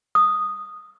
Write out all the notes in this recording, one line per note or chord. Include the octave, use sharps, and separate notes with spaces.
D#6